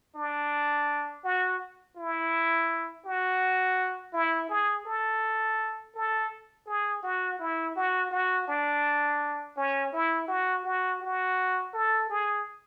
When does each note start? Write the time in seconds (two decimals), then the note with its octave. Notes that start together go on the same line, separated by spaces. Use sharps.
0.16 D4
1.24 F#4
1.97 E4
3.06 F#4
4.13 E4
4.49 G#4
4.86 A4
5.95 A4
6.66 G#4
7.03 F#4
7.39 E4
7.76 F#4
8.11 F#4
8.48 D4
9.57 C#4
9.93 E4
10.28 F#4
10.65 F#4
11.02 F#4
11.74 A4
12.10 G#4